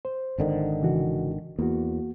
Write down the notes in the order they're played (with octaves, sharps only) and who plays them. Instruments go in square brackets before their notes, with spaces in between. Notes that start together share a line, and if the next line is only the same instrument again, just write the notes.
[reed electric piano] C5
[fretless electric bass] G#1 D3 D#3
[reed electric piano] C#3 E3 F#4
[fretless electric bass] E2 [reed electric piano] A#3 F#4